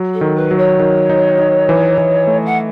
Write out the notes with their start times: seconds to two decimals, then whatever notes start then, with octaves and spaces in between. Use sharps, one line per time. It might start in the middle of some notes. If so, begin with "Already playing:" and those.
Already playing: F#3
0.13 A4
0.21 D#3
0.36 B4
0.51 F#3
0.57 C#5
0.80 D#3
1.10 D#4
1.39 D#4
1.69 E3
1.98 E3
2.27 A3
2.45 F#5